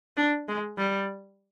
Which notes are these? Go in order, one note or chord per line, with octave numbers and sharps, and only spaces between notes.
D4
G#3
G3